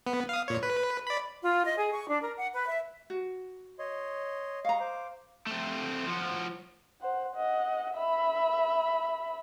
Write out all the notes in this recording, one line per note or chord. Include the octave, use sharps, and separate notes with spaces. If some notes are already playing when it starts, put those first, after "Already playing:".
B3
F5 D#6
A#2 C#5
B4
D5 B5
F4
D#5
G#4
C#6
D4
A#4
F#5
B4
E5
F#4
C#5 D#5 C6
D#5 F5 A#5 C#6
C5 D6
A3 C4
F3 F#4
C5 F#5
D#5 F#5
E5 B5